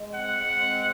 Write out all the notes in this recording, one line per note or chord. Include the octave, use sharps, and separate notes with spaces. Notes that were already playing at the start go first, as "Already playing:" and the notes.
Already playing: G#3
C4 F#5
G#3
C4